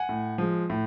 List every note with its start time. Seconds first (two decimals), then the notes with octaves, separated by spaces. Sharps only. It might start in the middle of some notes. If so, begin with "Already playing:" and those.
Already playing: F#5 G#5
0.09 A2
0.38 F3 G#3
0.70 A2